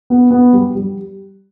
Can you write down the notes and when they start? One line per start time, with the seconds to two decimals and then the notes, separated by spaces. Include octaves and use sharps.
0.10 B3
0.31 B3
0.53 G3
0.75 G3